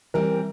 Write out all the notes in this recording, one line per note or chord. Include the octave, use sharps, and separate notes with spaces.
E3 G3 C4 A#4